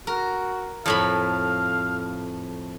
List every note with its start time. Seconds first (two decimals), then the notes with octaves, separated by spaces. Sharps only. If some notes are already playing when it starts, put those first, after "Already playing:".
0.07 F#4 A#4
0.86 F2 A2 F5 B5